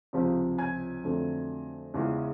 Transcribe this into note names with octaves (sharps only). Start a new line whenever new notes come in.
C#2 C3 F3
G#5 G#6
F2 D3 F#3 A3
E2 C#3 E3 G#3 C#4